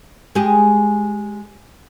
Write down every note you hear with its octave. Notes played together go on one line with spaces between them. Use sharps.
G#3 G4 G#4